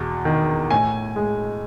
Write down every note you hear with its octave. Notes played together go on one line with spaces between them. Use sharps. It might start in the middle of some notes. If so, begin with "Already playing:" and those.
Already playing: E2 B2
D#3
A2 G#5
G#3